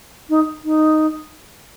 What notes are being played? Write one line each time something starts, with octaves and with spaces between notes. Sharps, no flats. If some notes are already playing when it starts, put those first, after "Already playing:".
D#4
D#4